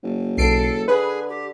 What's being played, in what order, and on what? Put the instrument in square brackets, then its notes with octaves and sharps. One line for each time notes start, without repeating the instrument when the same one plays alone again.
[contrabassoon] F#1
[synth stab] B1 C7 D7 [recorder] A4
[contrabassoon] D3 [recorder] G#4 [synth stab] B4
[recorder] G4